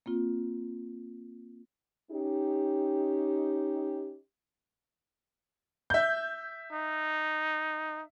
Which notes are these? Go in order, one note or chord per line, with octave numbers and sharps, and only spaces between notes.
A#3 C4 F4
C#4 D#4 G4
E5 G6
D#4